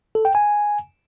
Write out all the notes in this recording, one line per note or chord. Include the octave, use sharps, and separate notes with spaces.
A4
G5
G#5